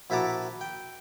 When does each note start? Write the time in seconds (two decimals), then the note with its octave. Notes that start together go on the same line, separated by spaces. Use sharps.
0.10 A#1 E4 F#4 A4 A#5 D6
0.61 G5